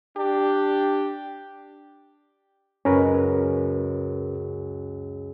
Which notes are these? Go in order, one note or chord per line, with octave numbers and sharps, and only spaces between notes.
D4 G4
C#2 F#2 C#4 A#4 B4